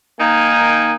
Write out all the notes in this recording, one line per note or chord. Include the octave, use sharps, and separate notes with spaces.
D#3 A#3 D#4 G#5